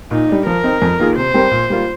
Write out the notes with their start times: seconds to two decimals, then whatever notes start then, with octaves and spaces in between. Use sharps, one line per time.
0.11 A#2 D#4
0.29 G3 D4
0.47 F3 A#4
0.64 C4 D#4
0.82 F2
0.99 D#3 A#3 F4 G#4
1.17 C3 C5
1.34 G3 C4 G4 A#4
1.51 A#2
1.70 G3 A#3 F4